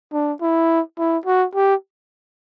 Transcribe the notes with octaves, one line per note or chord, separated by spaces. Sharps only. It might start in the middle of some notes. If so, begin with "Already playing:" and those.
D4
E4
E4
F#4
G4